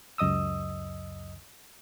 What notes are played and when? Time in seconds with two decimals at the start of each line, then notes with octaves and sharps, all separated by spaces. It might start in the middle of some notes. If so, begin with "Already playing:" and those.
0.18 C#2 F#2 D#5 D#6 E6